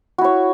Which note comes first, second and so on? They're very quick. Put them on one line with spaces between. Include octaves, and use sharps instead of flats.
F#4 E4 C#5